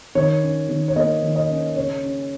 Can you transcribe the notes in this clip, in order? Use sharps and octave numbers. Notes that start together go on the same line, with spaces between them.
D#3 C#5
C#4
D#3
C#5
A#3 D#5
D#3
D#5
C#4
C#3 C#5
C#4